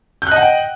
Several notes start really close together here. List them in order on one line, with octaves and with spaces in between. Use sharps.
G6 F#6 D#5 F#5 G5